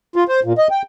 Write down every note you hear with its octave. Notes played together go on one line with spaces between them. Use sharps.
F4
C5
A#2
D#5
G5